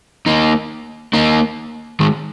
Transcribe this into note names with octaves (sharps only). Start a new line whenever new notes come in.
A#3 D#4
A#3 D#4
D#3 G#3